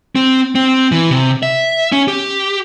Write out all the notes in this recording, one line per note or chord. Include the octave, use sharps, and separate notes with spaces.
C4
C4
E3
C3
E5
C#4
G4